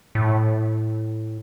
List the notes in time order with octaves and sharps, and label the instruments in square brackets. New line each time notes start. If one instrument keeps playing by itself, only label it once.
[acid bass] A2